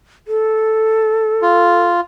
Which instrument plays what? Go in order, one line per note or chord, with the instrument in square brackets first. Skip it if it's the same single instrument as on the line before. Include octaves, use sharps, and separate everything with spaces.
[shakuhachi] A4
[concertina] F4